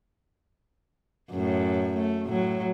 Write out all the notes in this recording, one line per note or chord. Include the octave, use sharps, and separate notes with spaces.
F#2 A2
A3
A2 F#3